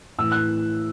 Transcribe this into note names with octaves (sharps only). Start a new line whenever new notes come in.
A2 E3 E6
F#6